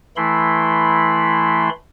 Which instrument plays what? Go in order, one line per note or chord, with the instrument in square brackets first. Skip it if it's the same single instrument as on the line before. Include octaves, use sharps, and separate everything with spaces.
[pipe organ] E3 A3 E4 B5 C6